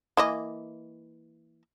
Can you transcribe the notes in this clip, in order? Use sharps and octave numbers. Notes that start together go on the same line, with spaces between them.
E3 A#3 D#5